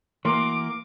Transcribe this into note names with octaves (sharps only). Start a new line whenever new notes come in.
E3 A#3 F#4 A#4 C6 D6